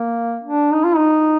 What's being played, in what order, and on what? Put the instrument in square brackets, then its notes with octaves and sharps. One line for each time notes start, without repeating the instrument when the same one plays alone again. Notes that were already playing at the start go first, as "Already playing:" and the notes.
Already playing: [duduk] A#3
D4
D#4
F4
D#4